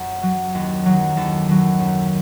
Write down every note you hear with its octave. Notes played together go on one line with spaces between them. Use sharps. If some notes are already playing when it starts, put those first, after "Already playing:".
Already playing: F#2
F#3
D#2
D#3 F#3
D#2 A4
D#3 F#3
F#2